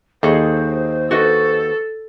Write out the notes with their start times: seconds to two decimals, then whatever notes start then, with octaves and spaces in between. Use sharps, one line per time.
0.23 D#2 G#4 A4 C5 D#5
1.11 F#4 A4 B4 D#5